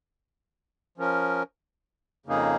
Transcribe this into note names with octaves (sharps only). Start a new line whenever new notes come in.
F3 C#4 A#4
F2 C#3 A#3 D#4 G#4